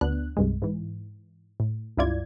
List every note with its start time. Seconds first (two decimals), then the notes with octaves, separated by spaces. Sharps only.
0.01 D2 B3 D4 F#6
0.37 C2 G2 G#3
0.62 G#2 E3
1.60 A2
1.97 C#2 G2 E4 F4 D5 G#6